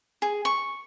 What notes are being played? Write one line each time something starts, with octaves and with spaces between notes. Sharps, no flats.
G#4
C#6